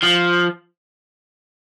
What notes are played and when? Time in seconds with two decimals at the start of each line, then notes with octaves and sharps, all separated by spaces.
0.03 F3